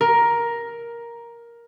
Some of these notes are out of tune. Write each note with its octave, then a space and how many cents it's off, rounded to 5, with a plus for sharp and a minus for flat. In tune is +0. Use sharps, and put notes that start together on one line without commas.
A#4 +10